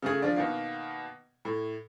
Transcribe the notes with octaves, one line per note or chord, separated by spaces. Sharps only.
C#3 A3 G#4
F3 D4
B2 D#3 A#3
A2